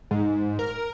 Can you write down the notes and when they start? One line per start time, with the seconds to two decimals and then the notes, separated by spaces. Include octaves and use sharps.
0.11 G#2
0.59 A#4